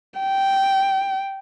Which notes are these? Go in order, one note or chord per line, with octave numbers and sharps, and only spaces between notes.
G5